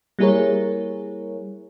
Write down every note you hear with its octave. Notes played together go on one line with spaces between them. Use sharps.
G3 A#3 E4 G#4 A#4 C#5